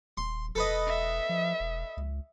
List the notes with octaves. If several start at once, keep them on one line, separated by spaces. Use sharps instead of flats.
D#1 C6
E1 A4 B4 D#5
E5
F3
E1
C#2